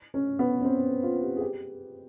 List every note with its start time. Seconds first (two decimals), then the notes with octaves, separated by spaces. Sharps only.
0.14 C#4
0.39 B3
0.60 C#4
0.65 C4
1.03 F4
1.22 G4
1.37 G#4
1.41 G4